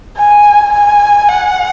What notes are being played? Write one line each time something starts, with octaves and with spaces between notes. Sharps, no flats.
G#5
G#5
F#5